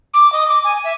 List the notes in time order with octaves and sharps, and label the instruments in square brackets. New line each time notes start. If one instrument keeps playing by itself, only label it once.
[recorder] D6
D#5
D6
G#5
E5